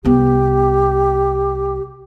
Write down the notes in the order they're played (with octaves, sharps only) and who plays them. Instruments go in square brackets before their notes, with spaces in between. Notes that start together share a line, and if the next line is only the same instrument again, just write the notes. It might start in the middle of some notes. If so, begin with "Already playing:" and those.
[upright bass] C2 B3 [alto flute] G4